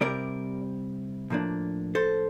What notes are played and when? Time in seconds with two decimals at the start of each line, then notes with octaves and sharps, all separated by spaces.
0.01 C2 C3 G3 A#4 D5
1.30 A2 F3 A#3 D4
1.95 A4 C5